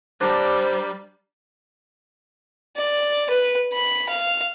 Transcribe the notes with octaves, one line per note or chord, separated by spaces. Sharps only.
G3 D4 A#4 C5
D5
B4
B5
F5